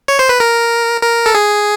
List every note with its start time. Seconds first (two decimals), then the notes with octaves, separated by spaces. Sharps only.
0.08 C#5
0.19 C5
0.29 B4
0.40 A#4
1.03 A#4
1.26 A4
1.35 G#4